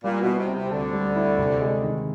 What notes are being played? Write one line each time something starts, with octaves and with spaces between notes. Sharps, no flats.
A#2 G3
B2
E4
C3
C4
C3
D2 D3 A4
G3
E4
C3
G#3
D#3